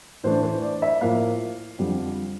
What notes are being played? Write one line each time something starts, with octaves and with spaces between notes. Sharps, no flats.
A2 E3 A3 D4 C5
C5
D5
E5
A2 F3 A#3 F5
F2 D3 G3